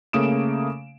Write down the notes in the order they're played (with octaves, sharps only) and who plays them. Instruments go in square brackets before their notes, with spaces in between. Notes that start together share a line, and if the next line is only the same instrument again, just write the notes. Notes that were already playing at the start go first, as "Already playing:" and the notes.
[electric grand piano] C#3 A3 A#3 D#6 D7 E7